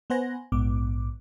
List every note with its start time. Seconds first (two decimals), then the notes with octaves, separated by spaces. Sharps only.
0.10 B3 B4 C5 F#5 G#5 A#6
0.52 A#1 G#2 B3 D6